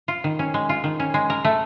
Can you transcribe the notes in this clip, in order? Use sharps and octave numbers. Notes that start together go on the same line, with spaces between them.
F4
D#3
C#4
G#3
F4
D#3
C#4
G#3
A#4
A3